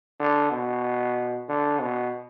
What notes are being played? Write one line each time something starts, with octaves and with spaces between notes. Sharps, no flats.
D3
B2
D3
B2